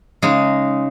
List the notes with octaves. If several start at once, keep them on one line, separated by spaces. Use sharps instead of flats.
C#3 G#3 D#4 G#4